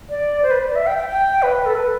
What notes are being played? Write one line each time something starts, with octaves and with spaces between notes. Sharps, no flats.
D5
C5
B4
D5
E5
G5
G5
G5
B4
A4
B4